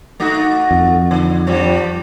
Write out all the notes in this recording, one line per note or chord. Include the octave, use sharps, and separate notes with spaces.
A3 D#4 F#4
F2
D3
G2 F3 G3